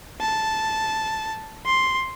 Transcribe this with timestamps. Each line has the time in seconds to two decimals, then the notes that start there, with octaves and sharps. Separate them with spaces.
0.21 A5
1.66 C6